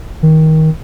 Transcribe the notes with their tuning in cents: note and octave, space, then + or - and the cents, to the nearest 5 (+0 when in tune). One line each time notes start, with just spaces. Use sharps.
D#3 +20